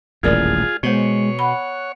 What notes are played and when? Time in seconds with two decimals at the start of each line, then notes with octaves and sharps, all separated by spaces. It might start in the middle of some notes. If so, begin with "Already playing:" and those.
0.23 D#1 A1 E2 G#3 F4 G#4 A#4 D5
0.83 B2 G#3 B3 C5 C#5
1.39 F#5 B5